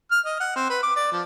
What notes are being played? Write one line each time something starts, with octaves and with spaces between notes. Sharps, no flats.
F6
D#5
F#5
C4
B4
D6
D5
F3